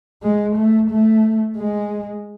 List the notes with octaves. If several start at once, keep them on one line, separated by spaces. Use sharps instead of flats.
G#3
A3
A3
G#3